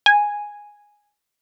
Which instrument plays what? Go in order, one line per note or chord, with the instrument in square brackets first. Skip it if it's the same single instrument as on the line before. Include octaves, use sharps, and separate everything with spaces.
[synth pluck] G#5